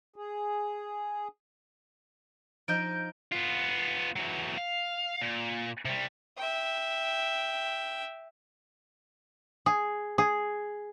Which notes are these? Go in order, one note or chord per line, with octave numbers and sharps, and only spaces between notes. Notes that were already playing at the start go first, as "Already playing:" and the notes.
G#4
F3 D#4 D#5 G6 D7
B3 F4
E3 F#3
F5
A#2
C3 G3
E5 G5
G#4
G#4